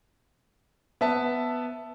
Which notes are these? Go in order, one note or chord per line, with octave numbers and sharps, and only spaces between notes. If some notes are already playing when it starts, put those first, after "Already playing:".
B3 E5 A5